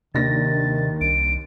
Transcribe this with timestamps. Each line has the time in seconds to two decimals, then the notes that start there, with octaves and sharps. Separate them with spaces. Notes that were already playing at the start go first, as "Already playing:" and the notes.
0.15 D#2 C3 D#3 D4 A6 A#6
1.01 C2 D7